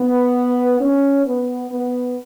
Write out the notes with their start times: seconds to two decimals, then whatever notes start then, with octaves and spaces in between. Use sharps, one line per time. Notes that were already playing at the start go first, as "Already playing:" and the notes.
Already playing: B3
0.80 C#4
1.26 B3
1.70 B3